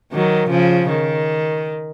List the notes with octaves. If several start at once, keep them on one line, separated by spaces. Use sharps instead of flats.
D#3 F#3
C#3 F3
D#3